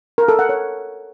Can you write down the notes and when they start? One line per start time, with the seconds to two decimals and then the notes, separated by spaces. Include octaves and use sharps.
0.18 A#4
0.28 A4
0.39 F#5
0.49 C#5